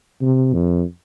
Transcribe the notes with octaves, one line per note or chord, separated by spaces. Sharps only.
C3
F2